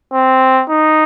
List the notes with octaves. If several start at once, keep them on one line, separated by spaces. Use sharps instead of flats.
C4
D#4